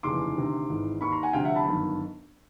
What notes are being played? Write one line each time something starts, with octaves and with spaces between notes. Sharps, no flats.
F1 D#2 C#3 E3 C6 D6
D2 C3 D#3
G#1 G#2 E3
D#2 D#3 B5 C#6
A#5 C6
F#5 G#5
D2 C3 F3 F5 G5
E5 F#5
A5 B5
G1 F#2 D#3